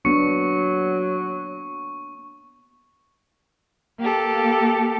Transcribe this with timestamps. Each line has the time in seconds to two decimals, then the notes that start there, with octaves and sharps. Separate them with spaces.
0.05 F#3 A#3 B3 D4 C#6 C#7
4.00 A#3 G4 A4